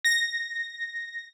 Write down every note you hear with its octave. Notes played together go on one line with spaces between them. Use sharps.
A#6